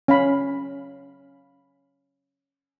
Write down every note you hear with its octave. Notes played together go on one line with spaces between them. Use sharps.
C#4 F5 B5